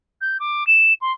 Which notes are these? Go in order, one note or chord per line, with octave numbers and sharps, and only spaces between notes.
G6
D6
E7
C6